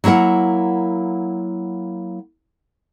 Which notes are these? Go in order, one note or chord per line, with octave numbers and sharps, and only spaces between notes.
F#3 A#3 E4 A#4 F#5